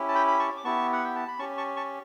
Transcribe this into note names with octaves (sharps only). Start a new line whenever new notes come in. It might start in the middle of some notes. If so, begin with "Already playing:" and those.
Already playing: C#4 E4 G4
A5
G5 B5
B5
A5 C#6
D6
B3 E4 G4 A5 C#6
F#5
G5
A5
B5
C#4 G4 A5 C#6
A5 C#6
A5 C#6